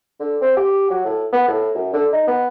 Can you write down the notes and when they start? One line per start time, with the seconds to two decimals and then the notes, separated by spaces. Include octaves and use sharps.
0.20 D3
0.41 C4
0.57 G4
0.90 F#3
1.05 A2
1.32 B3
1.48 A2
1.74 F#2
1.93 D3
2.13 D#4
2.27 B3